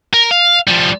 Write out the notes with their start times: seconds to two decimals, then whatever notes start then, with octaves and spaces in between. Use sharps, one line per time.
0.14 A#4
0.31 F5
0.67 F3 G3